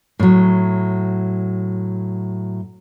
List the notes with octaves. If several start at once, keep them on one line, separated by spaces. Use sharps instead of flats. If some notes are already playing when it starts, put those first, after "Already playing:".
A2 F#3